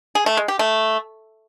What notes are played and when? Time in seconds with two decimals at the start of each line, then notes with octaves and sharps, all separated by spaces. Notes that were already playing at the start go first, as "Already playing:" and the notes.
0.15 G#4
0.26 A3
0.37 G#3
0.48 G4
0.59 A3